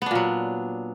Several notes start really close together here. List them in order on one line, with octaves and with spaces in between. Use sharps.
B3 D4 A#2 F#3